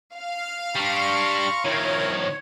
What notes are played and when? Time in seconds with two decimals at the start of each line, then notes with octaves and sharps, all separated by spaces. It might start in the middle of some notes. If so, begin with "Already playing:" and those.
0.15 F5
0.76 G3 D4 A#5 C6 C#6
1.65 D#3 F3 E4 F4 A#4 C#5